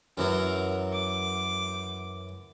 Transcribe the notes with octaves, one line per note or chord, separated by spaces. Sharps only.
F#2 E3 F#3 A#4
D6